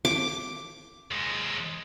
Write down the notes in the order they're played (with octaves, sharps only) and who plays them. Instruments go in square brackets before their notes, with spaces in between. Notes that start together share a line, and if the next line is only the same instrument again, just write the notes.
[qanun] D6
[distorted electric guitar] D#2 G#3